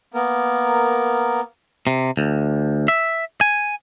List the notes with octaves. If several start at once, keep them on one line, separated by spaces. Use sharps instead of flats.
A#3 B3 A#4
C3
D2
E5
G#5